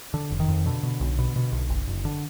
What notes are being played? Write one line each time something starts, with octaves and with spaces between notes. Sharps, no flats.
D3
F1
D#3
F2
B2 D3
B2
B1
B2
B2
B1
F#1
F#1
D3